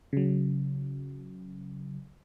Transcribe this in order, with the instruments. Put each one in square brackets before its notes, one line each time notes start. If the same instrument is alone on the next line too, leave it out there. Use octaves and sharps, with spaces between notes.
[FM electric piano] C#3 F#3